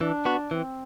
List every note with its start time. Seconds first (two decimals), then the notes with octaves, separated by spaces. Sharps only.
0.01 E3 D4
0.25 B3 F#4
0.51 E3 C4